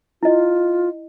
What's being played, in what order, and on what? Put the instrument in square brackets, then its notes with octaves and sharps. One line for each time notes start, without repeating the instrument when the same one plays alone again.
[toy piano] E4 D#5 [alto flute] F4